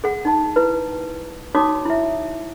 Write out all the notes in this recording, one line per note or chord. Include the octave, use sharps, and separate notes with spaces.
G#4 F#5
D#4 A5
E4 B4
D#4 F#4 C#5 A5 D6 D#6
E4 E5